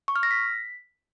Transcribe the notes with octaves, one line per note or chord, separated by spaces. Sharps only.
C#6
F6
A#6
B6